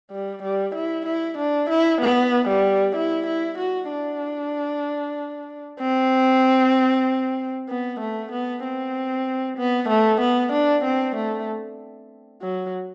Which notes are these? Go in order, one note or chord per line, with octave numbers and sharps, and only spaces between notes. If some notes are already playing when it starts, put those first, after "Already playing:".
G3
G3
E4
E4
D4
E4
B3
G3
E4
E4
F#4
D4
C4
B3
A3
B3
C4
B3
A3
B3
D4
C4
A3
F#3